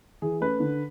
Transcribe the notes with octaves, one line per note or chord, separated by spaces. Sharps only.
E3 G#4
A3 C#4 B4
D3